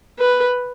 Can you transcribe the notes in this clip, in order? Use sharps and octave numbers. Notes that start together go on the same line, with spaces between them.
B4